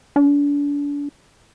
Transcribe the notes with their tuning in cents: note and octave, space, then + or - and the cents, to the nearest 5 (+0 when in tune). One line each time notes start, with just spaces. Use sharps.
D4 -35